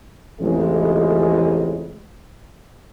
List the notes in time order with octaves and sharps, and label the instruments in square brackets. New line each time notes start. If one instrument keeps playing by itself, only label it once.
[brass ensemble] A1 F2 C#3 G#3